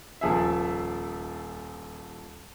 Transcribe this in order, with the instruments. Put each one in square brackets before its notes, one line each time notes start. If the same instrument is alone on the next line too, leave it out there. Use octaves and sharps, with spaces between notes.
[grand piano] D#1 F3 G#4 E5